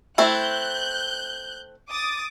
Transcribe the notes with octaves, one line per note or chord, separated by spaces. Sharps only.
A3 C4 E4 F#6 G6
D6 D#6 A6